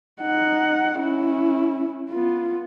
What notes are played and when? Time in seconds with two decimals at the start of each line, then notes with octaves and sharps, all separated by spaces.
0.22 D#4 F#5
0.98 C#4 E4
2.10 B3 F4